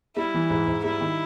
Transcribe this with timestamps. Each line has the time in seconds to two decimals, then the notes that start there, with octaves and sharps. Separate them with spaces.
0.17 G3 E4
0.34 E3
0.50 G#2
0.67 G#2
0.84 G3 E4
1.01 D#3